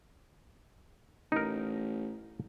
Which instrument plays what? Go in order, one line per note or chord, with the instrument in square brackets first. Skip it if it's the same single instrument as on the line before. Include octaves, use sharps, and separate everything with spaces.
[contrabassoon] A1 [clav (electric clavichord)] D#4 A#4